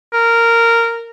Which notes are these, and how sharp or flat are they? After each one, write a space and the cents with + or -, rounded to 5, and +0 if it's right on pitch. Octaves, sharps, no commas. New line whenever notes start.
A#4 -10